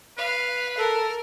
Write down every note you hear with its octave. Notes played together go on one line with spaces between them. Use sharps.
B4 F5
A4 A#4